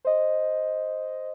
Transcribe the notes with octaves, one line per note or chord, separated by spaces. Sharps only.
C5 D#5